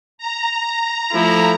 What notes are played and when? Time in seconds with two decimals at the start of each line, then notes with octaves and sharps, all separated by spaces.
0.18 A#5
1.13 F3 A3 E4